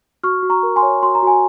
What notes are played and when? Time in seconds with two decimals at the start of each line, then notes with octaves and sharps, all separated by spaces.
0.23 F#4 C#6 F6
0.43 F#4
0.50 A#5 C#6
0.63 A#4
0.76 G#5 C6
0.82 C#5
1.03 F#4 C6
1.15 A#5
1.23 F#4 G#5